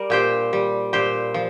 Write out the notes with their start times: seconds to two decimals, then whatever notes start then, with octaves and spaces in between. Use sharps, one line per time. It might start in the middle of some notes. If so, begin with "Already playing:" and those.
Already playing: G3 A#4 D5
0.10 A#2 G4 C5
0.53 G3
0.93 A#2 G4 C5
1.34 F3